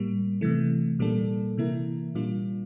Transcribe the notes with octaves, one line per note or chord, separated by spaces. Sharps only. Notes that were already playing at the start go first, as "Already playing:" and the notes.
Already playing: A2 G3 A#3
C3 E3 A3
A#2 G3 A#3 D4 A4
C3 E3 A#3 E4 A#4
A#2 G3 A#3 D4 F4